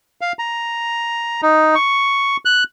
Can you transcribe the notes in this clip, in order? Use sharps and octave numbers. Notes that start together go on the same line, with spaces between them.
F5
A#5
D#4
C#6
F#6